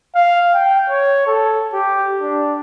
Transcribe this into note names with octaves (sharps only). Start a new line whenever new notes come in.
F5
G5
C#5
A4
G4
D4